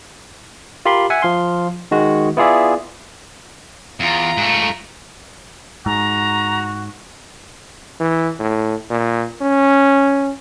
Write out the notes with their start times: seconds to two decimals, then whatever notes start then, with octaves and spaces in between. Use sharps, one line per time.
0.85 F4 G4 A#4 B5 C6
1.10 E5 F#5 G#5
1.22 F3 F5 C6
1.91 D#3 G#3 F#4
2.37 B3 E4 F4 G#4 D5 E5
4.00 E2 F4 A#5
4.37 G#2 A3
5.86 G#2 F#4 A#5
8.00 E3
8.39 A2
8.90 A#2
9.41 C#4